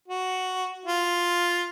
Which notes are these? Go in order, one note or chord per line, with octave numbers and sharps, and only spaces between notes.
F#4
F4